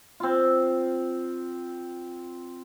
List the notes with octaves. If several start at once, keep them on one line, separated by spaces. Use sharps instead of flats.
C4 F4